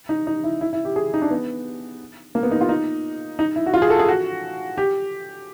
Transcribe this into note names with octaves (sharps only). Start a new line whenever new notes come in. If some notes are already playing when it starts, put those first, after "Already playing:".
D#4
D#4
E4
E4
E4
G4
G#4
D#4
D4
B3
A#3
B3
D#4
F4
D#4
D#4
E4
F#4
F4
G#4
A4
G#4
F#4
G4